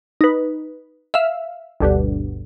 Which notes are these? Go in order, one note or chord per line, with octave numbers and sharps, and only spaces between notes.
D#4 B4
E5 F5
G1 D2 G2 B2